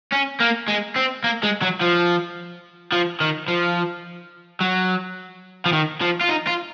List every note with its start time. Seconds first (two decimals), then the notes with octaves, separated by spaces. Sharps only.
0.13 C#4
0.40 A#3
0.68 G#3
0.96 C4
1.24 A#3
1.43 G#3
1.62 F#3
1.81 F3
2.92 F3
3.21 D#3
3.48 F3
4.61 F#3
5.66 F3
5.73 D#3
6.01 F3
6.21 F4
6.29 D#4
6.47 F4